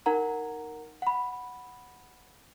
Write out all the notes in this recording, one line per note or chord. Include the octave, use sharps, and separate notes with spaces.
D#4 A#4 F#5 A#5
F#5 B5